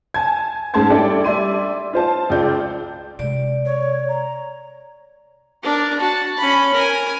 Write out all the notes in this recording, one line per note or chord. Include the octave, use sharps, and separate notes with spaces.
G#5 A5 G#6
G#2 C#4 A5 C6 G#6
G3 D4 E4 A4 D5 G5
G3 D5 E5 C6 D#7
F4 C5 A5
C#2 F4 D5 G6
C3 G#3 D5
C#5
A#5
D4 A#4
F#4 A5
C#4 B5
A#4 G#5